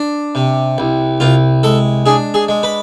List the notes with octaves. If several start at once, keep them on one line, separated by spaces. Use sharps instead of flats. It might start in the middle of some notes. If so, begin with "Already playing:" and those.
Already playing: D4
C3
C2
C2 F4
G#3 A4
D4 G#4
G#4
G#3
B4